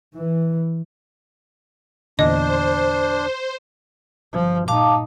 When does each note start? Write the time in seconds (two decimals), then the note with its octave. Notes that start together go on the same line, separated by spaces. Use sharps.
0.14 E3
2.19 E2 A#2 D3 D4 C5 D#5
4.33 G1 F3
4.68 A#2 D#4 F5 A5 D6